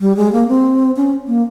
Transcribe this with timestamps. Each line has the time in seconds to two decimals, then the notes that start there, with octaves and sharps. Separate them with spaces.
0.01 G3
0.17 G#3
0.33 A#3
0.48 C4
0.97 C#4
1.27 A#3